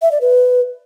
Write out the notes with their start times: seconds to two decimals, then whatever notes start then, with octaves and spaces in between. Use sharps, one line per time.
0.02 E5
0.12 D5
0.21 B4